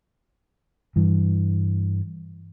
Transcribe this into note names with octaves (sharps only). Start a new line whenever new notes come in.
G2 E3